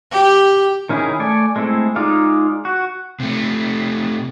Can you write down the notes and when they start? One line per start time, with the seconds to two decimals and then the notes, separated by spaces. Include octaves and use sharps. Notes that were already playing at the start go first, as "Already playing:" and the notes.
0.11 G4
0.89 D#3 C#4 D#4 E4 G#4
1.20 A3 D5 G#5
1.56 G#3 A3 C4 E4
1.96 G#3 D#4 F4 D5 F5
2.65 F#4
3.20 C3 A3